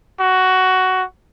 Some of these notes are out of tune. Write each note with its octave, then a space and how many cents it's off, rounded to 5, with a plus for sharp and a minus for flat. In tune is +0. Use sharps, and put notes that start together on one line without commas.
F#4 +10